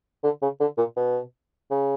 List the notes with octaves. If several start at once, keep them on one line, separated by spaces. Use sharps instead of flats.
D3
C#3
D3
A#2
B2
C#3